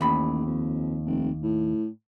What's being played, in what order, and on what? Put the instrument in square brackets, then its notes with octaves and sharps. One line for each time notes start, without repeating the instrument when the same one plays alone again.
[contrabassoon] A1 [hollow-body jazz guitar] D#2 B5
[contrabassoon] F2
F1
A2